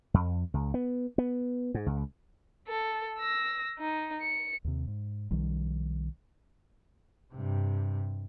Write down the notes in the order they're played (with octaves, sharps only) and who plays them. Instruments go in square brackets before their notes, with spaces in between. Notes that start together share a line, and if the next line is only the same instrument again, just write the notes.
[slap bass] F2
C#2
B3
B3
G#2
C#2
[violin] A4
E6 A#6
D#4
C#7
[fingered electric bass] D#2 C3
G#2
B1 D#3 F3 G3
[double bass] G2 C3